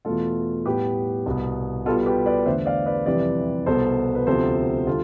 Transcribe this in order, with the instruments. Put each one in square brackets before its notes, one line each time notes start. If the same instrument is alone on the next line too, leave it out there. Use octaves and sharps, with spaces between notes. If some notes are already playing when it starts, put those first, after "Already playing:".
[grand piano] E2 B2 A3 F4 A4
A2 G3 B3 G4 B4
C2 B2 B3
B2 G3 B3 F4 A4
G4 B4
B4 D5
E2 D3 A3 C5 E5
D5 F5
B4 D5
F2 C3 E3 G3 B4 D5
C2 B2 B3 A4 C5
B4
D2 C3 F3 B3 A4 C5
D3 G3 F4 A4